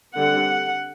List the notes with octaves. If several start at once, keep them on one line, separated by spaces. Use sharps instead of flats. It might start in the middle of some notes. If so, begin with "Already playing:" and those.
D3 G3 C4 F#5